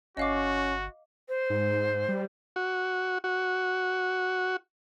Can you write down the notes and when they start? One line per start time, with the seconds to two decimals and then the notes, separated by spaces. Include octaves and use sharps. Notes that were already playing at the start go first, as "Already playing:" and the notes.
0.17 G1 C#4 F#4 D#5 F5 D6
1.29 C5
1.50 G#2
2.09 G3
2.56 F#4
3.24 F#4